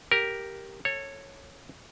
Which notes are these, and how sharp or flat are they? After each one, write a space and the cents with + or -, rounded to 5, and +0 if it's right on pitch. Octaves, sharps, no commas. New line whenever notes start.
G4 +0 A#4 +0
A4 +20 C#5 -10